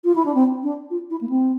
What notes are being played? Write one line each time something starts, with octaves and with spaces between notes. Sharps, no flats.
F4
E4
D4
C4
D4
F4
E4
A#3
C4